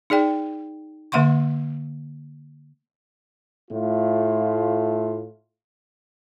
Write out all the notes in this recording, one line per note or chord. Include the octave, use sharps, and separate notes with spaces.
D#4 G#4 D5 G5
D3 A#3 E5 F#5 C6 C#6
A2 A3 F4